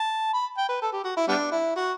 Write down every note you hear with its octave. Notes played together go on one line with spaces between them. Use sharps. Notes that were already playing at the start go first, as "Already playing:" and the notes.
Already playing: A5
B5
G5
B4
A4
G4
F#4
E4
G3 B3 D4
E4
F#4